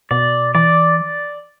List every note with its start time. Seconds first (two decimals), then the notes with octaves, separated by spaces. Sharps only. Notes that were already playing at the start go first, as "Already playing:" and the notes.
0.11 B2 D5
0.55 E3 D5